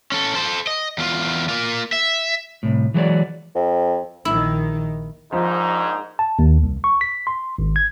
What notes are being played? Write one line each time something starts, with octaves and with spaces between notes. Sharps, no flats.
C#4 A4
A4 C5
D#5
E2 F4
A#3 F4
E5
C2 A2
E3 F#3 G#3 G4 C#5 D5
F2
A#1 D#3 E4
A#1 G#2 F3 D#4
A5
D#2
C2
C#6
B6
C6
G#1
G#6